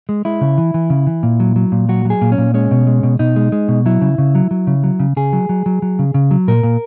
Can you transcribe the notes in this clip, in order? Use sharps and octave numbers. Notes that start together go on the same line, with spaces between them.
G#3
G#3 E4
C#3
E3
E3
C#3
E3
A#2
F#3
F#3
A#2
F#3 F#4
F#3 G#4
A#2
C#4
A#2
G#3 C#4
B2
G#3
B2
B2 D#4
G#3
G#3
B2
F#3 E4
C#3
C#3
F#3
F#3
C#3
F#3
C#3
C#3 G#4
F#3
F#3
F#3
F#3
C#3
C#3
F#3
A#2 A#4
A#2